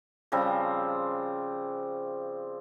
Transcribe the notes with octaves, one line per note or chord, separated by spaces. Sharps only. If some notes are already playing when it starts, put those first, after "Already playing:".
C#3 F3 G3 C4